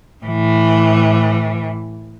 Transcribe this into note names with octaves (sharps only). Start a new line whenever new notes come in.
A2 E3